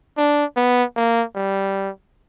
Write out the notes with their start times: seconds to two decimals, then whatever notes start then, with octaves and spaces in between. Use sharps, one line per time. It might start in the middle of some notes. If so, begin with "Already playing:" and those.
0.18 D4
0.57 B3
0.96 A#3
1.35 G3